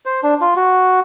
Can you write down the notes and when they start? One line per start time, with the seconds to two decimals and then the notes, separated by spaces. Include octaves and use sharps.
0.05 C5
0.23 D4
0.41 F4
0.56 F#4